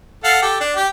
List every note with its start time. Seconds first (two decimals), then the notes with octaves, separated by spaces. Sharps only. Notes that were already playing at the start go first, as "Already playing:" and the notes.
0.24 A4 F5 F#5
0.42 G4 A4
0.61 D4
0.76 G4